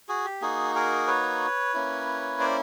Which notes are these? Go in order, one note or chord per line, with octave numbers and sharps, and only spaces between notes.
F#4 G#4
G4
A#3 D#4 F#4 G#4
G#4 A#4
B4 C#5
A#3 C#4 E4
C5 D5